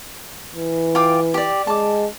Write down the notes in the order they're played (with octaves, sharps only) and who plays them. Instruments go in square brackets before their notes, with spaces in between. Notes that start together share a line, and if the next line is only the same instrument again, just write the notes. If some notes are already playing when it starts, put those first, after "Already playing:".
[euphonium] E3
[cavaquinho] F4 G5 D6
G4 D5
[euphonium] G#3 [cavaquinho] A5 D6